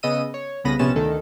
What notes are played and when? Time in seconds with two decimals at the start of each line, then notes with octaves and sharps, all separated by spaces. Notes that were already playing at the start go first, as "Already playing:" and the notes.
0.03 C#3 B3 D#5 E6 D#7
0.34 C#5
0.64 C2 C#3 B3 B5 A#6 D#7
0.79 A#1 C3 B3 C#4 A6 E7
0.95 D2 D#3 A4